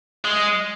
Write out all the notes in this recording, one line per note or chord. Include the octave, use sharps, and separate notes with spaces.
G#3